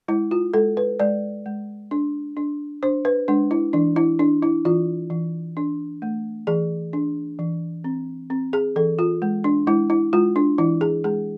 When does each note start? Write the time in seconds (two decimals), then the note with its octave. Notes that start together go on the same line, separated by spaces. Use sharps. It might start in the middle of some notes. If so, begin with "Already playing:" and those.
0.08 G#3 E4
0.31 F4
0.54 G#3 A4
0.77 B4
1.00 G#3 D5
1.46 G#3
1.91 D4
2.37 D4
2.83 D4 C5
3.05 B4
3.28 G#3 D4
3.51 E4
3.73 E3 D4
3.96 E4
4.19 D4
4.42 E4
4.65 E3 F4
5.10 E3
5.57 D4
6.02 A3
6.47 E3 G#4
6.93 D4
7.39 E3
7.84 C4
8.30 C4
8.53 G#4
8.76 E3 A4
8.99 F4
9.22 G#3
9.44 D4
9.67 G#3 E4
9.90 E4
10.13 G#3 F4
10.36 D4
10.58 E3 E4
10.81 G#4
11.04 G#3 G#4